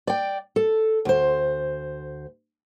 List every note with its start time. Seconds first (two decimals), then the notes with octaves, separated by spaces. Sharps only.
0.07 D5 G5
0.56 A4
1.05 D2 C5